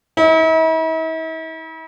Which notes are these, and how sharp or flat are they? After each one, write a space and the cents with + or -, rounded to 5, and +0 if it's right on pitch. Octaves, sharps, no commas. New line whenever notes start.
E4 -45